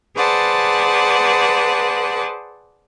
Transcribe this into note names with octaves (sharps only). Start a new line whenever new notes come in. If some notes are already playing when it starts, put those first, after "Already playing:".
G#4 B4 C5 D5 F#5 A5